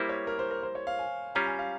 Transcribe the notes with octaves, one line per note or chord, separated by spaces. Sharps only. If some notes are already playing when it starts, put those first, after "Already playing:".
Already playing: G3 A#3 E4 C5
C#5
A#4
C5
A#4
C5
C#5
F5
G#5
G3 C#4 F4 A#5
G#5
F5